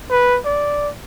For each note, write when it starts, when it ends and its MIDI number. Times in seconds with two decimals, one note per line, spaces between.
0.10 0.39 71
0.45 0.89 74